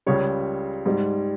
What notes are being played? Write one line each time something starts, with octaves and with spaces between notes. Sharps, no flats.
C#2 C#3 G3 C#5
G#2 G3